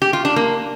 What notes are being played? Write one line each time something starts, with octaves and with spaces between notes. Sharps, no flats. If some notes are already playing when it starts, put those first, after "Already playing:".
G4
F4
D4
A#3